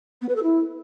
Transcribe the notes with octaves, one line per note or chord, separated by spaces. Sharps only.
B3
B4
A4
E4